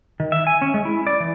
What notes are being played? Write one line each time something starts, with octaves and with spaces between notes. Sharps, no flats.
D#3
E5
G#5
C#4
G#3
E4
D5
E3